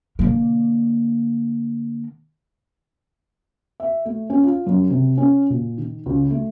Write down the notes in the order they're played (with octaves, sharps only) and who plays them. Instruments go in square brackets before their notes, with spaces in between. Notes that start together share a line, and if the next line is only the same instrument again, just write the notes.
[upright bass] D3 A#3
[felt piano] E5
A3
C#4
F4
F#2
C3
C#4
A#2
D#3
C#2
A3